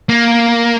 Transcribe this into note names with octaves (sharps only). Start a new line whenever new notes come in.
A#3